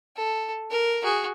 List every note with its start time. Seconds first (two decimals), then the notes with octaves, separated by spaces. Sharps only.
0.17 A4
0.71 A#4
1.03 F#4 G#4